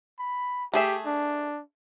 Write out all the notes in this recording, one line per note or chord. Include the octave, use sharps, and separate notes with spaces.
B5
A3 G4 G#4 E5
D4